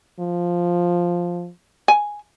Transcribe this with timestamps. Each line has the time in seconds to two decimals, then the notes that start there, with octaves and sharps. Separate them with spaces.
0.19 F3
1.88 G#5